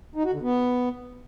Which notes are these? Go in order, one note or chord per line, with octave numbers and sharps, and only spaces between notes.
D#4
F#4
D3
B3